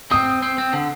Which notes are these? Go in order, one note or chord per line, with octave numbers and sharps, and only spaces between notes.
C4 D#6
C4
C4
D3